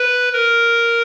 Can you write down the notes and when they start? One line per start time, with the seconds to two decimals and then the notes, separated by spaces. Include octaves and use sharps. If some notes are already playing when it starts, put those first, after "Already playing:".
Already playing: B4
0.33 A#4